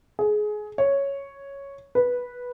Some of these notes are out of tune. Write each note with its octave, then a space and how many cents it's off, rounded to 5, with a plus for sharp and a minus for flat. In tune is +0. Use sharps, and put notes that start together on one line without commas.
G#4 +20
C#5 +0
B4 -10